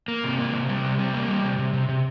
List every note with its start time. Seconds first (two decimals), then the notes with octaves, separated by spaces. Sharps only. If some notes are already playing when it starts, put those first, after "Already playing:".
0.08 A#3
0.24 C3
0.39 A#3
0.53 C3
0.69 G3
0.83 C3
0.99 G3
1.13 A#3
1.28 G3
1.44 C3
1.59 C3
1.74 C3
1.89 C3